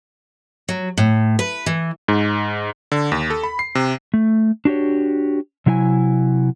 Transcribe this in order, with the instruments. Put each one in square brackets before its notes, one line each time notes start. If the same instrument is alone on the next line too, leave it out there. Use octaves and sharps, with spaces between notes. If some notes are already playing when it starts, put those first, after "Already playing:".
[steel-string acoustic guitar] F#3
A2
B4
E3
[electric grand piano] G#2
D3
D#2
A4
B5
C7
C3
[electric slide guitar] A3
D4 F#4 G4 C#5
C3 F#3 E4 C#5 G#5